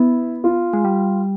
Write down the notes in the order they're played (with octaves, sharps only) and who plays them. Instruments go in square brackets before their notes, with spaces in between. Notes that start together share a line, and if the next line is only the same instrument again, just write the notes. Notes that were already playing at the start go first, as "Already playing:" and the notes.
Already playing: [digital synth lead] B3 [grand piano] E4
[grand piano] F4
[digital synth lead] G#3
G3